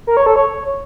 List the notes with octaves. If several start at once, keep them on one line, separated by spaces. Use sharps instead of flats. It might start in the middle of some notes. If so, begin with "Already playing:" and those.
A#4
C#5
A4
C#5